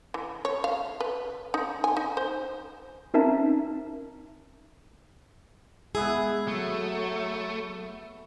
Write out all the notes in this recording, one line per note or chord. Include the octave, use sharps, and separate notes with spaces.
E3
C#5
F5
B4
D#4
G#5
D#4
C5
C4 C#4 D#4 A#4 E5 A5
G#3 B3 E4 G#4 E6
F#3 A3